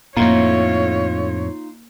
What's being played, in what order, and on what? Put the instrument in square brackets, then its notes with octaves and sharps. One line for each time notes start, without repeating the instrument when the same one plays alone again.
[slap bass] F2 A2 [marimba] A#3 [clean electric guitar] D#4 F4 [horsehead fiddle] C#5